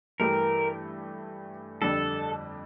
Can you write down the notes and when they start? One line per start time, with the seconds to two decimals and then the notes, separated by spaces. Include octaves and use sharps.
0.20 G2 E3 A3 E4 G4 A#4
1.81 F2 D3 G3 D4 A4